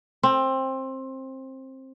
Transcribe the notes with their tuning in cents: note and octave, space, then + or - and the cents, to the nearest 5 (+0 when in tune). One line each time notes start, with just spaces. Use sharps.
C4 +20